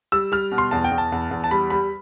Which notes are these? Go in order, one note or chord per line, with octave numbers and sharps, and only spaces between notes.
G3 E6
G3 F6
B2
C6
E2 A5
G5
E2
A5
E2
E2
A5
G3 B5
G3 B5